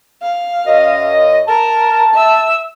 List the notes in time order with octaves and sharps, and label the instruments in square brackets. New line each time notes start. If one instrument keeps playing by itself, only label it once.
[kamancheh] F5
[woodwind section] F#2 D#5
[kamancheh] A#4 [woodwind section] A5
[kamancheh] E5 E6